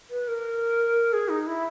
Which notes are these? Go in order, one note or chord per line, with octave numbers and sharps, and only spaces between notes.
B4
A#4
G#4
D#4
E4